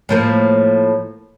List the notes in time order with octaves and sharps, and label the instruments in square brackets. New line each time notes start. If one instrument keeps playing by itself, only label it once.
[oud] A2 F3 A#3